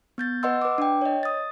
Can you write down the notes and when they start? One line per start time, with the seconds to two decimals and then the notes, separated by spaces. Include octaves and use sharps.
0.18 B3 G6 A6
0.43 B4 D#5 F#5 C6 E6
0.62 B4 D6
0.78 D4 G5
1.02 C#5 D#5
1.23 D#6 A6